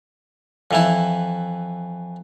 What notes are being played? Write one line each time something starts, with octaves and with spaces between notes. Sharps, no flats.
F2 E3 E4